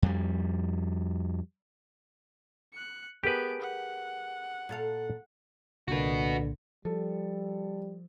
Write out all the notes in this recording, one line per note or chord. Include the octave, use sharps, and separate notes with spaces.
F2 G3
F#6 C#7
B3 G4 G#4 A#4 B4 D7
F#5
A#2 A4 F5
C2 A#2 D3 A#3 F#4 B4
F3 G3 A4